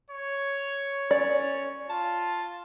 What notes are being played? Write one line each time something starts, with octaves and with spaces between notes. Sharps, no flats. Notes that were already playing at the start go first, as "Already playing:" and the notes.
C#5
C#4 D5
F4 A5